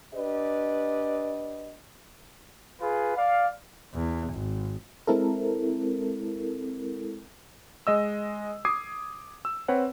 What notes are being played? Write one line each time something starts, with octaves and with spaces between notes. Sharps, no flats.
D4 G4 B4 D5 D#5
F4 G#4 B4
D5 F5
E2
G#1
G#3 C4 E4 A4 A#4
G#3 D#5 E6
D6 D#6 G#6 C7
E6
C4 B4 C#5 F#5